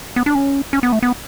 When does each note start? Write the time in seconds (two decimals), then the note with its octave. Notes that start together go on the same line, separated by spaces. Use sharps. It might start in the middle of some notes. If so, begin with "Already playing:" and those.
0.16 B3
0.26 D4
0.35 C#4
0.73 C#4
0.83 B3
0.92 A3
1.03 B3